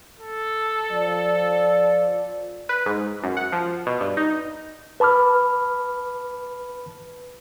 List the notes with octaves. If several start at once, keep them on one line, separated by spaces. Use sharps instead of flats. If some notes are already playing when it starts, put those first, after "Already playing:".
A4
F3 D5
B4
G#2
F#2
F#5
F3
B2
G2
D#4
B4 A5 B5 D6 F6